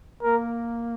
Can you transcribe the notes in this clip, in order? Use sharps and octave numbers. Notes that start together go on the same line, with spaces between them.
A#3 A#4